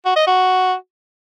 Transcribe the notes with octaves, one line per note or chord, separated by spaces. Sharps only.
F#4
D#5
F#4